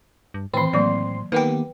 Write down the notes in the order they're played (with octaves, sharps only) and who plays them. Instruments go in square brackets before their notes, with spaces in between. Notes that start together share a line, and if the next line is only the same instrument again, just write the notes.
[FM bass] G2
[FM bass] A2 [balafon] D#3 E3 [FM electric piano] C4 C6
[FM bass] A2 [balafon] F#3 A#3 D5
[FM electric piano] D#3 B3 G4 [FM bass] A#3 [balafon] B4 G5